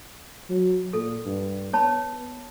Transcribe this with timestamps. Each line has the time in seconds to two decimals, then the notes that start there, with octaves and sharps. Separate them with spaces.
0.50 F#3
0.93 A#2 A4
1.26 G2
1.73 B3 C#5 A5 B5